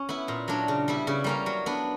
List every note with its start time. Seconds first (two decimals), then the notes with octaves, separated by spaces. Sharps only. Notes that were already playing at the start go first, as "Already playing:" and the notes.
Already playing: C#4
0.09 B3 E4
0.28 A#2
0.48 F#3 A#3 D4
0.68 C#3
0.88 G3 B3 E4
1.07 C#3
1.24 G3 A#3 C#4
1.46 F#3
1.66 B3 D4